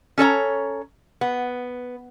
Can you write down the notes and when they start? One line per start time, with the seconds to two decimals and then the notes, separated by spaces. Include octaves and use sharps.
0.18 C#4 A4 C#5 A#5
1.21 B3